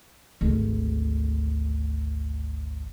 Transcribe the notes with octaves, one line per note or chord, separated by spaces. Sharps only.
G#1 D2